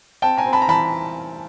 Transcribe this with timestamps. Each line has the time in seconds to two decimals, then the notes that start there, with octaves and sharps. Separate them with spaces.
0.22 C4 G5 A5
0.38 G#5 A#5
0.46 C4
0.53 A5 B5
0.62 A#5
0.68 E3 A5 B5